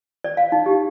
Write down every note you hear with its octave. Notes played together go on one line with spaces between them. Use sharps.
D5
F5
D#4
G4